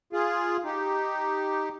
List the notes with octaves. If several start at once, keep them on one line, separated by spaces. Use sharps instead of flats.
F4 G#4
D#4 G4